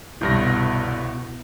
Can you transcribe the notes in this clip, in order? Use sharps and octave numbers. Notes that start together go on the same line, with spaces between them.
G1 C2 G2 B2 E4 A#6